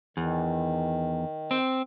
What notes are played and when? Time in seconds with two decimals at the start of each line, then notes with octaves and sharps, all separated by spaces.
0.17 E2 D#3
1.51 C4